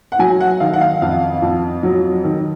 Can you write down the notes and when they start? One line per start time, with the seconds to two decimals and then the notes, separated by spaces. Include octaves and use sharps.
0.12 F#5
0.19 F#3 G#5
0.40 F#5
0.60 D#3 F5
0.74 F#5
0.81 F5
1.02 F2 F5
1.42 F2
1.83 F#3
2.24 D#3